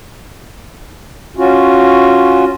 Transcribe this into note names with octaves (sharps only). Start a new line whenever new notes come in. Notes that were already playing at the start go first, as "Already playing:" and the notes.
C#4 F4 F#4